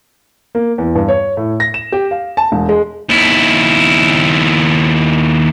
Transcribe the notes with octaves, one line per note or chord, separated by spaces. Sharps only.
A#3
E2
G2
C#5
A2
A#6
E7
G4
F5
A5
E1
G#3
D#2 E4